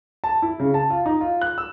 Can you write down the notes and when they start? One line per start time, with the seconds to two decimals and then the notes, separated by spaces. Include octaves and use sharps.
0.24 A5
0.42 E4
0.60 C#3
0.74 A5
0.90 F4
1.06 D#4
1.21 F4
1.41 F#6
1.58 E6